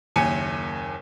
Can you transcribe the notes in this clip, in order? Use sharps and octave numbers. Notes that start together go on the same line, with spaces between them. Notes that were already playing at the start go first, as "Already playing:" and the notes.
F#1 D#2 G#5 C#7